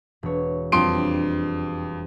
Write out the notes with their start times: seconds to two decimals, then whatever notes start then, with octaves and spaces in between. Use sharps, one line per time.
0.23 E1 C#5
0.72 F2 G3 D4 C6 D7